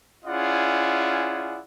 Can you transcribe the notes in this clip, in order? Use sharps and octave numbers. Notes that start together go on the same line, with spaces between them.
C#4 E4 F4 G#4 D5 F#5